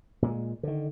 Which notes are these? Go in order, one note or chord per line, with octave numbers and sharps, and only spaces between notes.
A#2 G#3
D3 D#3